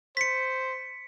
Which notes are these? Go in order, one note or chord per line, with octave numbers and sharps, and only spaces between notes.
C5 B6 C#7